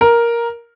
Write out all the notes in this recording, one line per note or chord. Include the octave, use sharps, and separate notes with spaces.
A#4